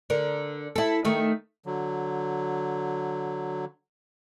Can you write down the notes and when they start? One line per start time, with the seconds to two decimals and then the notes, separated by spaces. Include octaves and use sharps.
0.10 D3 A#4
0.76 E4 A4
1.05 D#3 A3
1.66 D3 F#3